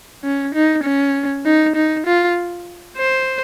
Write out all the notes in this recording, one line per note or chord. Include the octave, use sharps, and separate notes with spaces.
C#4
D#4
C#4
D#4
D#4
F4
C5